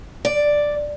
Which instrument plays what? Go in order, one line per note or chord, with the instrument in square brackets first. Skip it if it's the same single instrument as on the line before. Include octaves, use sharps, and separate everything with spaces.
[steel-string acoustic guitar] D5